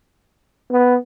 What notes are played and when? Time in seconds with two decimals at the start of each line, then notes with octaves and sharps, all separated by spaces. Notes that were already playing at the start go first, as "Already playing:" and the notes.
0.71 B3